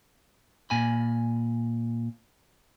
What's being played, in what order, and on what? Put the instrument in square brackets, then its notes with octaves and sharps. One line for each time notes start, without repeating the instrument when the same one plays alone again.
[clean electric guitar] A#2 G#5 B5